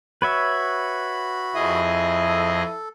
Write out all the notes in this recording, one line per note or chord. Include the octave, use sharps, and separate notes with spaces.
F#4 B4 C#5 E5 B5
F2 E4 G#4 D#5
A4